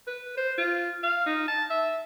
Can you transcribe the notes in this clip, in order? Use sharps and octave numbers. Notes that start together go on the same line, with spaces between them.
B4
C5
F4
F5
D#4
A5
E5